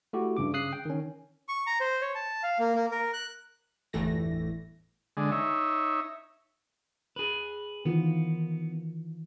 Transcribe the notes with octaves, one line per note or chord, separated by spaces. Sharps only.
A3 E4 F#4 G4
G2 C#3 D6
C#3 D#6 F#6 C7
G5
D#3 C#4
C#6
A#5
C5
C#5
A5
F5
A#3
A#3
A#4
F#6
G1 E2 A2 E3 A3 A#6
D3 G#3
D#4 C#5 E5
G#4 B4
D#3 E3 B3 F4